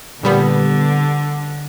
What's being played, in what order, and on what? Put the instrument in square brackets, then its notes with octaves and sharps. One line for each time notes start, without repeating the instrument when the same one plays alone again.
[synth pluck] A#2 G3 B3 [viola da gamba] D3